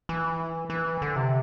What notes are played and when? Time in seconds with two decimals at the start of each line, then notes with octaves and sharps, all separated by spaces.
0.09 E3
0.70 E3
1.02 D3
1.16 C3